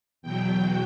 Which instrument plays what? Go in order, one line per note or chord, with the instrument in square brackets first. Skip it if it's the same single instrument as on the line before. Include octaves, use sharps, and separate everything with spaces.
[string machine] E2 B2 F#3 G5